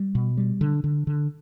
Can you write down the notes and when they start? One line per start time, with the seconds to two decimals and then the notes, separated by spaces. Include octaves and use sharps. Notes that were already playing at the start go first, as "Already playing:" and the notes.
Already playing: G3
0.15 B2
0.37 G3
0.61 D3
0.84 D3
1.07 D3